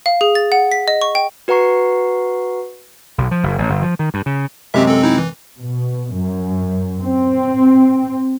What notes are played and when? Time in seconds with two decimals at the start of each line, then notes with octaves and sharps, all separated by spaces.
0.06 F5
0.21 G#4
0.35 A6
0.52 F#5
0.72 B6
0.88 D#5
1.02 C#6
1.15 G5
1.48 F#4 B4 F#5 A#5 C#6 C7
3.18 B1
3.31 F3
3.43 F#1
3.58 A1
3.70 G1
3.83 F3
3.99 D#3
4.14 G2
4.26 C#3
4.74 F#2 C3 G#3 C4 G4 E5
4.88 C4 A4
5.02 C4 D#4 E4
5.18 E3
5.58 B2
6.15 F#2
7.01 C4